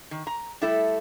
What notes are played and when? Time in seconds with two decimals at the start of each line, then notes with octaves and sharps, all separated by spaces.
0.11 D#3
0.27 A#5
0.61 G3 A3 E4 A4 E5